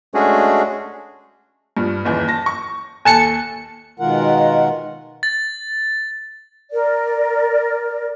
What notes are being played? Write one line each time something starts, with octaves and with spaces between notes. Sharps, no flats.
G#3 A3 C#4 D4 F#4 G#4
G2 F3
F#1 D#2 E3
A5 A#6
C#6
D#2 A4 G#5 A5 F#6 C#7
B2 D#3 G#3 F4 A#4 F#5
A6
A#4 D5